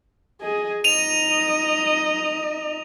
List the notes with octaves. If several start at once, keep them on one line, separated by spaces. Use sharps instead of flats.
G#4 D#5
D#4 D#5 D#7 F7